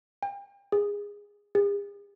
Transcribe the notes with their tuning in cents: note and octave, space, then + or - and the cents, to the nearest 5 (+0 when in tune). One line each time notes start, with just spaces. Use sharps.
G5 +35
G#4 -20
G#4 -45